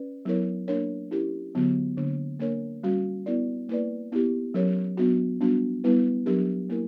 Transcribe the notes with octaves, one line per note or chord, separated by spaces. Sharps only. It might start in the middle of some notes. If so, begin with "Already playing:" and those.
Already playing: C#4 B4 D5
F#3 B3 E4 A#4 C#5
A#3 D4 A#4 C#5
C#4 E4 G4 A#4
D3 F#3 B3 F#4
D3 A#3 D4
A#3 D4 A#4 C#5
G3 C#4 F#4
B3 E4 A#4 D5
A#3 E4 B4 D5
B3 E4 G4
F#3 C#4 G4 A#4 C#5
F#3 B3 D4 F#4
G3 B3 D4 F#4
G3 B3 E4 B4
F#3 B3 D4 G4 A#4
A#3 E4 A#4